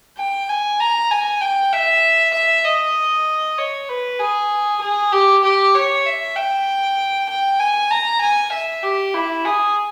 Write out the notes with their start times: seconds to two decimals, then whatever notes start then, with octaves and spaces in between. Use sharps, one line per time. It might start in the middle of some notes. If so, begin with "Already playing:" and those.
0.18 G5
0.49 G#5
0.80 A#5
1.11 G#5
1.41 G5
1.73 E5
2.34 E5
2.65 D#5
3.58 C#5
3.89 B4
4.19 G#4
4.81 G#4
5.12 G4
5.43 G4
5.75 C#5
6.06 E5
6.35 G5
7.29 G5
7.59 G#5
7.91 A#5
8.21 G#5
8.52 E5
8.83 G4
9.14 E4
9.45 G#4